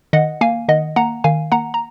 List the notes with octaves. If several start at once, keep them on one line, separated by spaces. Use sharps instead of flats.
D#3 D#5 F#5
A#3 F5 G#5
D#3 D#5 F#5
A#3 F#5 A#5
D#3 F5 G#5
A#3 F#5 A#5
A#5